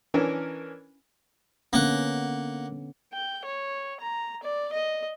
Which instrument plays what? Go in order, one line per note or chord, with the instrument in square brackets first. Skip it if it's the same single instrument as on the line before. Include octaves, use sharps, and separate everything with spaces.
[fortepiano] E3 C#4 D4 A#4
[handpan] D3 B3 C#4 [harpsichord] A#3 F#5
[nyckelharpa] G5
C#5
A#5
D5
D#5